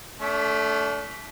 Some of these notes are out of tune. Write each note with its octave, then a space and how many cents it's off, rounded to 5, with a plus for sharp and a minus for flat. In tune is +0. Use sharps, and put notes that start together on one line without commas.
A3 +0 D4 -40